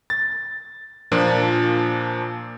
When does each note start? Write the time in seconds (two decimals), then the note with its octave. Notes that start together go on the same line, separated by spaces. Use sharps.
0.10 A6
1.12 A#2 F3 A#3 D4